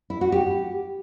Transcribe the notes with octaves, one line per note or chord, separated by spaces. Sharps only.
E4
F#4
G4